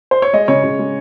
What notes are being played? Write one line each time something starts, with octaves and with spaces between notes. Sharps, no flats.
C5
C#5
G#3 D#5
C#3 C#5
C#3
G#3